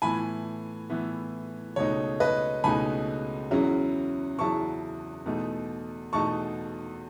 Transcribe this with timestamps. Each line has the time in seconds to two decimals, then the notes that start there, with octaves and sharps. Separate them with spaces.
0.02 A2 E3 B3 G#5 B5
0.90 A2 E3 B3
1.76 C#2 B2 A3 D#4 C#5
2.20 B4 D#5
2.64 C#2 B2 A3 D#4 G#5 B5
3.51 E2 C#3 F#3 C#4 E4
4.38 E2 C#3 F#3 C#4 E4 A5 C#6
5.26 E2 B2 A3 D#4
6.13 E2 B2 A3 D#4 A5 C#6